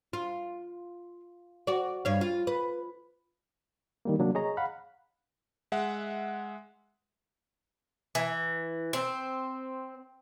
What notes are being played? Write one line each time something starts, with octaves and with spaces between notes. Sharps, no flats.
F4
F#4 D5
G2 C#5 F5
F4
B4
D#3 G3 A#3
C3 F#3 A#3 D4
G#4 C#5 D#5 A#5
F5 F#5 B5
G#3 E5 F#5
E3
C4